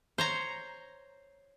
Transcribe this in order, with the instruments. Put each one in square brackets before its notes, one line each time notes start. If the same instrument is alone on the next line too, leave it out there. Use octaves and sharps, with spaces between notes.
[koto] C5 C#5 A#5